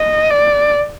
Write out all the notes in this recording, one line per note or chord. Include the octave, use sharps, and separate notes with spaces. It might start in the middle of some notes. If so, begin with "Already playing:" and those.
Already playing: D#5
D5